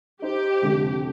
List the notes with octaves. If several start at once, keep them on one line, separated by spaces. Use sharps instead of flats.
D#4 G4 C5
F1 D3 G#3